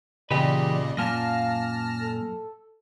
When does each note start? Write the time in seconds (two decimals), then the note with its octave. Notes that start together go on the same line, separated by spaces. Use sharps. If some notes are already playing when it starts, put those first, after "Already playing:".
0.31 E2 A#2 C#3 G4 B4 D5 D#5
0.97 F#2 A#2 F5 A5 F6 A#6
2.01 A4